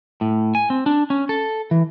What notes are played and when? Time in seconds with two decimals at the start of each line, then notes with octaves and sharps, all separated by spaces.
0.21 A2
0.55 G#5
0.70 C4
0.86 D4
1.10 C#4
1.29 A4
1.71 E3